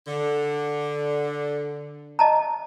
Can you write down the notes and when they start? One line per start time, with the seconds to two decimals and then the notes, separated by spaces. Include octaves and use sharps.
0.07 D3
2.19 D#5 A5 A#5